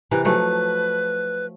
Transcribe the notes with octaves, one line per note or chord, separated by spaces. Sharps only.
C3 E3 A#4 B4
F3 F#3 A3 B4